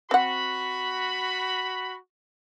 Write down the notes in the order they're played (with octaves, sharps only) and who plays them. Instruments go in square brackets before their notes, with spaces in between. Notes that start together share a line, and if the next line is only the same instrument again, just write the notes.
[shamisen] C4 F#5 [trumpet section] F#4 B5